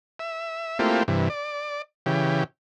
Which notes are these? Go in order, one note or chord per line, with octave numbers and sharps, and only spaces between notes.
E5
A3 A#3 C4 E4 F4 G4
G2 C3 E3
D5
C#3 E3 G4